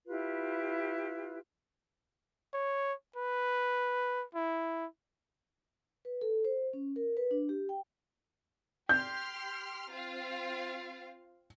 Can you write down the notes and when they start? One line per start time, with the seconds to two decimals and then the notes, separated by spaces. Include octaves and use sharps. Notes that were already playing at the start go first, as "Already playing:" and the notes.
0.07 E4 F4 G4 B4
2.54 C#5
3.16 B4
4.35 E4
6.05 B4
6.21 A4
6.45 C5
6.73 C#4
6.96 A#4
7.17 B4
7.31 D4
7.49 G4
7.69 G5
8.89 G4 C6 F6 G6
9.90 C4 F4 F5